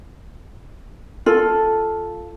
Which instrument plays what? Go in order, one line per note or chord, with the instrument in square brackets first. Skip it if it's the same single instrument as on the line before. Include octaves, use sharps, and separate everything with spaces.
[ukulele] F4 A4